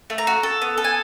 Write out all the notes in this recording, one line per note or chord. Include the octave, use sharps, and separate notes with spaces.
A3
A#5
F#4
A4
B3
A4
G#5